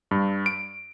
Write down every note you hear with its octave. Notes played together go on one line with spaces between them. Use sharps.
G2
D7